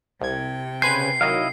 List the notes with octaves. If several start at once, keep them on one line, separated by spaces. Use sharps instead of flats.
C2 C3 G5 G#6
C#3 B4 C5 G#5 G6 C7
D#3 F#3 E4 D#5 F5